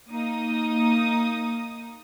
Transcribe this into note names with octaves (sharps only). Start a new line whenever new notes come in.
A#3 D#4 D#6